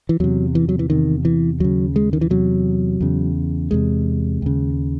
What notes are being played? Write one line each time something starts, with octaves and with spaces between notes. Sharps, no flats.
E3
E2 C3 F#3
E3
F#3
E3
E2 C3 D#3
E3
D#2 C#3 F#3
G#3
D#3
E3
E2 C3 F#3
E2 C#3
E2 C3 G#3
D#2 C#3